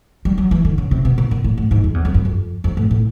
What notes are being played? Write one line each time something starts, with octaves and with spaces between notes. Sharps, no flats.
G3
F#3
E3
D3
C#3
C3
B2
A#2
A#2
A2
A2
G#2
F2
E2
F2
F#2
F2
F2
A2
A2